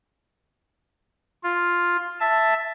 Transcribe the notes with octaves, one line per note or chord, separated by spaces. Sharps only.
F4
E5 A5